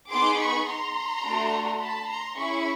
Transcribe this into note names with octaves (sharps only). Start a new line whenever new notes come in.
B3 D#4 G#4 C6 D6
B5 C#6
A#5 C6
A3 D4 F#4 A4
A5 B5
A#5 C6
C#4 E4 G#4 B5 C#6